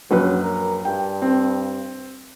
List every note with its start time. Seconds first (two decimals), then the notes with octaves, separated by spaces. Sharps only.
0.11 A#1 F#2 F#3 B4
0.43 A#4
0.85 G2 G5
1.22 C4